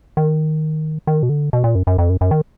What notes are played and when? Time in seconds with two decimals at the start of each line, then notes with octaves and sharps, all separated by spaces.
0.17 D#3
1.07 D#3
1.23 B2
1.29 D3
1.53 B2
1.64 A#2
1.75 F#2
1.87 F#2
1.98 F2
2.09 F#2
2.21 F#2
2.31 D#3